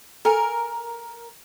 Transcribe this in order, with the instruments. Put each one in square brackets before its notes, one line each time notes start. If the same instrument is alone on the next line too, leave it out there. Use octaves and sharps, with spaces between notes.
[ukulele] A4 G#5 [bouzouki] A#4